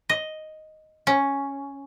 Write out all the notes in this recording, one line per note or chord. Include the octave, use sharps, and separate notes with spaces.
D#5
C#4